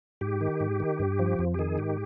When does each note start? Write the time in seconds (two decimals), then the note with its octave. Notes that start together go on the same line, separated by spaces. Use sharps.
0.21 G#2 G4
0.41 D#3
0.60 G#2
0.80 D#3
0.99 G2
1.19 F3
1.39 F2
1.54 G4
1.59 D#3 G#4
1.78 G#2 G4